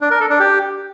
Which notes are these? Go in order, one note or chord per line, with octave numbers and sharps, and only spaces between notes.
D4
A#4
A4
D4
G4